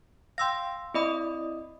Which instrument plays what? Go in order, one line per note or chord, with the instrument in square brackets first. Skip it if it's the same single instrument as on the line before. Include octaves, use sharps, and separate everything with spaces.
[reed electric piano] F5 G5 [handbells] C6 E6 A#6
[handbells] C4 D#5 B5 [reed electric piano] E4 D5 D#6